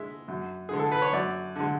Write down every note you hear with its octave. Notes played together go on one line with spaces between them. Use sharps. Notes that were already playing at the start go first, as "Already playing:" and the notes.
Already playing: G#3 E5
F#2
D3 G#3 G#4
A4
B4
C#5
F#2 D5
D3 G#3